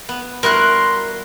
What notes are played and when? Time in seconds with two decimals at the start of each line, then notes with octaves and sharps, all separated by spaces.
0.09 B3
0.43 G3 E4 F#4 A#4 C6 F#6